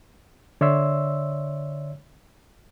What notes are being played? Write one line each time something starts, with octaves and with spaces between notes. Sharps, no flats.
D3 C#5 D5 E5 C6 E6